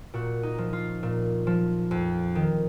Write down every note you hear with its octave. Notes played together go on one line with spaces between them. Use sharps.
A#2 F#4
D#4
F3
F4
A#2
F3
F2
D#3